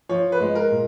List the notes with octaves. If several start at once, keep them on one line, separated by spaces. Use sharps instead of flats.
F3 C#5
B4
G#3
A#4
A#2